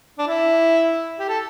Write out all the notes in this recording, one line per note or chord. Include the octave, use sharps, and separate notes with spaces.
D4
E4
G4
A4